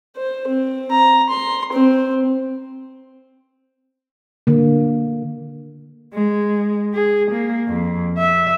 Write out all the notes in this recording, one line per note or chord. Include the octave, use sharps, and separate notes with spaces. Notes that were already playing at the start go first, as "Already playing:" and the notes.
C5
C4
A#5
C6
C4
D3 A#3
G#3
G#4
A#3
F2
E5